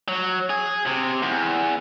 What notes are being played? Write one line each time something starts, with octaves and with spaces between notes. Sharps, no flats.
F#3
G#4
C3
E2